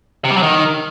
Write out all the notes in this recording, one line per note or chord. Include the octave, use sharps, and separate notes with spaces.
C3
G3
F#3
D#3